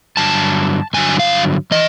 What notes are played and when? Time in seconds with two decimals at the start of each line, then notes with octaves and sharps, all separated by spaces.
0.17 G2 D3 F#3 A5
0.93 G2 D3 F#3 G#5
1.19 F5
1.71 E3 D#5